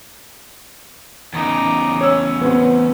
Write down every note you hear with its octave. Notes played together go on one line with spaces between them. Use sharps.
E2 C#3 D#4 D6
C#4 C#5 E6
B3 C4